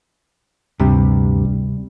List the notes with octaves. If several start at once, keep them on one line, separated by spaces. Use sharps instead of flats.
D2 G2 C3 G3